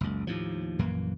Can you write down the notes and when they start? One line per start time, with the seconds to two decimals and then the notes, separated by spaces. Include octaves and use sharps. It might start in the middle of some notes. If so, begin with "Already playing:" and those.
0.01 F#1 C#2
0.27 D#2 A2 F3
0.79 A#1 F#2 E3 A#3